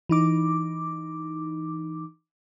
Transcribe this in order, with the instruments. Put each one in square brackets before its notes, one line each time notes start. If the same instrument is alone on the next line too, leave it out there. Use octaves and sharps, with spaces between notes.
[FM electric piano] E3 D#4 D6